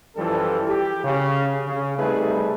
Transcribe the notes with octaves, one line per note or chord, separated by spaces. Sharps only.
F#2 E3 F3 G3 A4
G4
C#3
C#3
C3 G3 A3 D#4 G#4 B4